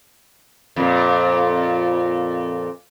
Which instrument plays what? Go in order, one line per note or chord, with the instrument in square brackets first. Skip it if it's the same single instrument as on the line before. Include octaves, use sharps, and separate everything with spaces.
[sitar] F2 A#2